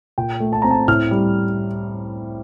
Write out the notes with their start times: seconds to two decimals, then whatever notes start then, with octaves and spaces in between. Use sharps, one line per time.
0.18 A#2 G5
0.40 A3
0.53 A5
0.62 C4 A#5
0.71 A5
0.88 A2 F6
1.11 G3